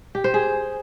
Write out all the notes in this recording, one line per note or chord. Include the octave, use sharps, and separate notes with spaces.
G4
C5
G#4